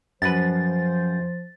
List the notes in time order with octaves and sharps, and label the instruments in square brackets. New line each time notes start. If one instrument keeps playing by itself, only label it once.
[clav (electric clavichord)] F#2 B4 [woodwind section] F3 C5 [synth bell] A6